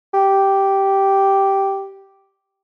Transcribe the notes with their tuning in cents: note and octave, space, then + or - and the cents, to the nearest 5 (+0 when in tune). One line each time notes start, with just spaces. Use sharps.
G4 -5